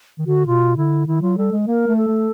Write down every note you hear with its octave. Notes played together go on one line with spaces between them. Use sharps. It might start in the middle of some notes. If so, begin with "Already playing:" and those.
D#3
D3 F#4
B2 F4
D3 E4
D#3 E4
F#3 F4
G3 A4
G#3
A#3 A#4
A3
A4
A3